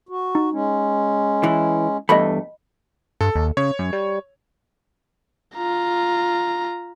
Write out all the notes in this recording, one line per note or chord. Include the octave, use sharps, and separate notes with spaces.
F#4
D#4
G#3 C#4
E3
E2 G2 A3 D#5 B5
G2 A4
D#2
C#3 C#5
F#2
G3
F4 A#5